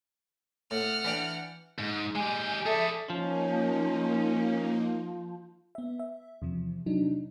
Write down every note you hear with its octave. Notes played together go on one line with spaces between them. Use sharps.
A2 F#5 F6
E3 D4 G5
G#2
G#3 G4 G#5
G#4 A4 D5 E5
F3 A#3 C#4 D#4
B3 E5
E5
E2 C3 F3
C3 F#3 D4 D#4